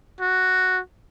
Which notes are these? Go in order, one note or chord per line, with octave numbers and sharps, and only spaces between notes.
F#4